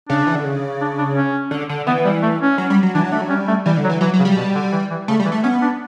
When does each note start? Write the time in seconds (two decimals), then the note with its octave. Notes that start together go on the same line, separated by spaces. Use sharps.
0.08 C#3 D4
0.27 E3
0.35 D3
0.45 C#3
0.81 D4
0.98 D4
1.15 C#4
1.51 D3
1.69 D3
1.87 E3 B3
2.05 G3
2.22 A3
2.41 C#4
2.58 F#3
2.70 G3
2.83 F#3
2.94 E3 D4
3.04 F#3
3.12 A3 D4
3.21 F#3
3.29 G3 C#4
3.47 A3
3.66 E3 G3
3.77 D3
3.84 F#3
3.89 E3
4.01 E3 F#3
4.14 F#3
4.19 C#3
4.25 G3
4.36 B2
4.55 D3
4.72 E3
4.90 E3
5.08 C#3 A3
5.20 G3
5.25 E3
5.32 A3
5.43 B3 C#4
5.61 D4